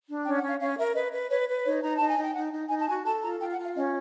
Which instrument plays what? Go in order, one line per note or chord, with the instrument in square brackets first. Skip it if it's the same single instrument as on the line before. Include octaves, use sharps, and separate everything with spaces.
[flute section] D4
C#4 G5
F#5
C#4
F5
C#4 F5
A#4 E5
B4 D#5
B4
B4 C#5
B4
D#4 C#5
D#4 A#5
D#4 A5
G#5
D#4
G5
D#4 F#5
D#4
D#4 G#5
A5
F#4 G#5
A4 A5
F4 A#5
F4 G5
F#5
F4
F5
C#4 D#5